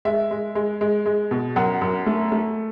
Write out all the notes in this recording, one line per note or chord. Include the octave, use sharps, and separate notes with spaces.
G#3 E5
G#3
G#3
G#3
G#3
B2
F#2 F#5
F#2
A3
A3